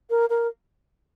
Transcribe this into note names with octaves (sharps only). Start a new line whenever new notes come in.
A#4
A#4